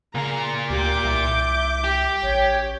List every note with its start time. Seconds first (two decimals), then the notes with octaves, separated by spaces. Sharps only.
0.15 A#2 C#3 F5 A#5
0.70 D2 G4 D6 G6
1.04 C2 E5
1.84 G4
2.23 A1 C#5